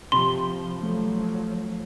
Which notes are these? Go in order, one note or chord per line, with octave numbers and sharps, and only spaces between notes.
C3 F3 B5 C6
F3 F#3 A3